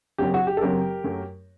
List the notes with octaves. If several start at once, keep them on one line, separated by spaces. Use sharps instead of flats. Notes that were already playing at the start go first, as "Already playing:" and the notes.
F#1 F#2 F#3 C4 G4
F#4
G4
A4
F#1 F#2 F#3 C4 G4 A#4
F#2 F#3 A3